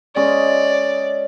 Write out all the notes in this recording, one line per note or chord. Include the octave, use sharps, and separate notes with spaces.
G#3 C#4 D5 D#5